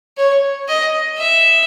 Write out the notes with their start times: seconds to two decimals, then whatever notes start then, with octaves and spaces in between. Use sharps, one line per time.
0.17 C#5
0.68 D#5
1.18 E5